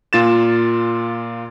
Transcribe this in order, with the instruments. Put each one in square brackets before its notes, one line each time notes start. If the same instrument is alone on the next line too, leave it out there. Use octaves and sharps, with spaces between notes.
[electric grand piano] A#2 F4 A6 E7